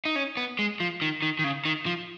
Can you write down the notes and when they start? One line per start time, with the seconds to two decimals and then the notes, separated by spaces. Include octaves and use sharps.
0.05 D#4
0.16 C#4
0.37 B3
0.59 G#3
0.80 F3
1.02 D#3
1.22 D#3
1.39 D#3
1.44 C#3
1.65 D#3
1.86 F3